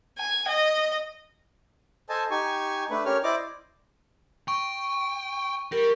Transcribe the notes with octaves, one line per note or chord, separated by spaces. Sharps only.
G#5
D#5
A4 C5 D#5 G#5 A5
D#4 G4 G#5 C#6
A3 D4 B4
C#4 G4 A#4 C#5 F6
E4 C5 D5 D#5 D6
G5 C#6
G3 G4 A#4